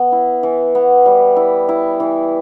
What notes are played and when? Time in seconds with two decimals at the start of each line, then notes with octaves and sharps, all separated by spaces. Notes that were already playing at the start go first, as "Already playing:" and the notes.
Already playing: B3
0.12 E4
0.43 E3
0.75 B3
1.06 G3
1.36 E4
1.69 E4
2.00 E3